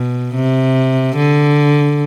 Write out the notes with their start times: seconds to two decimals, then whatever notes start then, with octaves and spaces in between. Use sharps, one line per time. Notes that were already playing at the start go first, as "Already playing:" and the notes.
Already playing: B2
0.35 C3
1.16 D3